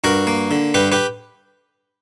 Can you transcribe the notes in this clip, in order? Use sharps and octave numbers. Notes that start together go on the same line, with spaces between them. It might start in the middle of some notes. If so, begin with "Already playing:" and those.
G2 F#4 A#4
A#3
D3
G2 G4 B4
G4 B4